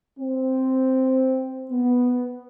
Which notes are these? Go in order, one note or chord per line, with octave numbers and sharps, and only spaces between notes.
C4
B3